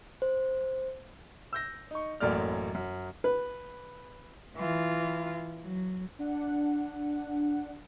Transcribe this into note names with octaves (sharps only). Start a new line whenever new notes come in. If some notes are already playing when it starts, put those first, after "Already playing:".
C5
E6 G6 A#6
D#4 C#6
A1 F#2 A3 A#3 D5 F6
F#2
B4
E3 F4
F#3
D4 F#5